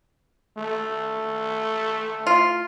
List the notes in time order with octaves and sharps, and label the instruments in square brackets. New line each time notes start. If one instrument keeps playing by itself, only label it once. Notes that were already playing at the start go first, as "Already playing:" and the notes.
[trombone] A3
[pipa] F4